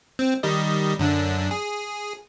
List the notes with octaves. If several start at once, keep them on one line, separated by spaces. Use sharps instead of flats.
C4
D#3 G3 D#5
F#2 D3 D4
G#4